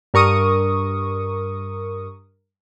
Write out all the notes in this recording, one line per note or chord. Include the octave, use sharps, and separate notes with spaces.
G2 A#4 C#6 D#6